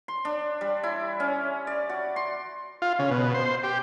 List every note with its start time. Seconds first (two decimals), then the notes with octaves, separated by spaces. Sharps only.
0.08 C6
0.25 D4
0.61 G3
0.83 E4
1.20 C#4
1.67 D5
1.89 F#4
2.16 C6
2.82 F4
2.99 C#3
3.11 B2
3.34 C5
3.63 G4